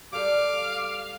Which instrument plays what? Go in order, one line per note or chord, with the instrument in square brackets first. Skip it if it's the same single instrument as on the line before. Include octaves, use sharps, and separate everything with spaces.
[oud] G3 A4 [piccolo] F5 [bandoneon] D6